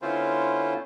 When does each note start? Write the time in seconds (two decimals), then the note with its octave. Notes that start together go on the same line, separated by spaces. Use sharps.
0.02 D3 B3 C#4 E4 F4 C5